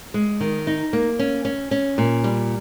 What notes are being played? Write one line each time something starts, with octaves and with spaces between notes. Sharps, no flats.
G#3
D#3
D#4
A#3
C#4
C#4
C#4
A#2
G3